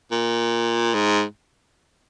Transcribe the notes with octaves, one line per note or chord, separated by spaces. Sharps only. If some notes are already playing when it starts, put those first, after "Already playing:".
A#2
G#2